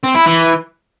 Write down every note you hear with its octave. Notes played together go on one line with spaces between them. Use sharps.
C4
E4
E3